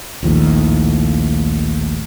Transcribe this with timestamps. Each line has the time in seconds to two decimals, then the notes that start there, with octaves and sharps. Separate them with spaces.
0.23 A#1 D#2 A2